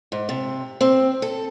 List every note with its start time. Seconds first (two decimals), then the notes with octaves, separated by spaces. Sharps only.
0.12 G#2
0.29 C3
0.81 C4
1.22 A4